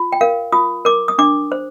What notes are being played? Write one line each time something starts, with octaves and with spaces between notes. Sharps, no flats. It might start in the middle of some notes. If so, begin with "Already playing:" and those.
Already playing: F4
G5
A#4 F5
F4 D#6
A#4 D6
D#6
D4 D6
C5